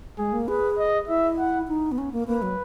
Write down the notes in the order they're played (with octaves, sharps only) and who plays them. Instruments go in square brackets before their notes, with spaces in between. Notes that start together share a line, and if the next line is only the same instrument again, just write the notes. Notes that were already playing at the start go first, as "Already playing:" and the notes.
[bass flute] G#3 [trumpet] G#4
[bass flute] A#3
[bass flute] G#4 [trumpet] B4
[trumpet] D#5
[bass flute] E4 [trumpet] E5
[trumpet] F#5
[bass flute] D#4
B3
C#4
A#3
[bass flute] A#3 [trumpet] B4
[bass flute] F#3